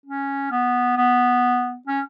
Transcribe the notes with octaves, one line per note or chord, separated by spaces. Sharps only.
C#4
B3
B3
C#4